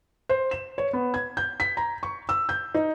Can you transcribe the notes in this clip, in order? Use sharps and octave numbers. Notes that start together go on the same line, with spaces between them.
C5
E7
C#5
B3
G#6
G6
B6
A#5
C#6
E6
G6
D#4